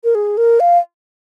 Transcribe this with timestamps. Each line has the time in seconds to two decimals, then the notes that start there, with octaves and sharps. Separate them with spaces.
0.04 A#4
0.15 G#4
0.37 A#4
0.60 F5